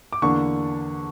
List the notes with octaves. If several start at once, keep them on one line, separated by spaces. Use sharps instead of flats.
D6
E2 D3 A#3 D4 C#6